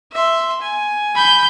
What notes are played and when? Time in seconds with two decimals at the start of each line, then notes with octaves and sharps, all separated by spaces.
0.13 E5 C6
0.62 G#5
1.15 B5 G6